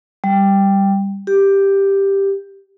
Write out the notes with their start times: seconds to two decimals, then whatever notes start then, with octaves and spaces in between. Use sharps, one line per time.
0.24 G3
1.27 G4